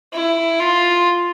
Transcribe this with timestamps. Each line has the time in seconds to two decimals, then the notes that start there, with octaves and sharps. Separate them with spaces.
0.13 E4
0.59 F4